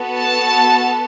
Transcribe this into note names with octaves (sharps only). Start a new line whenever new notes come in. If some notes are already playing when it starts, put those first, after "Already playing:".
Already playing: B3 F#4 A4
A5